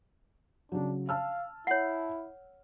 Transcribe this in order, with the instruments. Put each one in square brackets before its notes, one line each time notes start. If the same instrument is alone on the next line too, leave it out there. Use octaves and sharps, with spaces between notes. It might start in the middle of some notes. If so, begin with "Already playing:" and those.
[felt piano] C#3 F#3 [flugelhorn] D4
[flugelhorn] F5 [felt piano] A5 E6 F6
[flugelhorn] E4 [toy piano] C#5 F#5